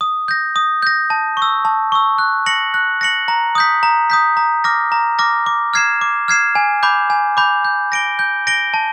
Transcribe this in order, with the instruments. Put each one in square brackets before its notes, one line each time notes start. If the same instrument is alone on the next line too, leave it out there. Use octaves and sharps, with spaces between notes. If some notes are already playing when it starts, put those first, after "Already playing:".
[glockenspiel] D#6
G6 A#6
D#6
G6 A#6
A5
C#6
E6
A5
C#6 E6
F#6
A#6 C#7 F#7
F#6
A#6 C#7 F#7
A#5
D#6 G6 B6
A#5
D#6 G6 B6
A#5
D6 F6 A#6
A#5
D6 F6 A#6
D6
F6 G#6 C7 E7
D6
F6 G#6 C7 E7
G#5
B5 D6 G6
G#5
B5 D6 G6
G6
A#6 D7 G7
G6
A#6 D7 G7
A5